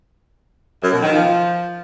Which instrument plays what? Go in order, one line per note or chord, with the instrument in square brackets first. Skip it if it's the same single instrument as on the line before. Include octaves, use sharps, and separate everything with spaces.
[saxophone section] F#2
B2
D#3
F3